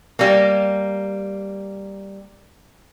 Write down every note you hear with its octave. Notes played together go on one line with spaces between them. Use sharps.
G3 A#3